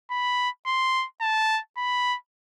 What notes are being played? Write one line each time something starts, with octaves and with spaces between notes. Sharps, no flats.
B5
C6
A5
B5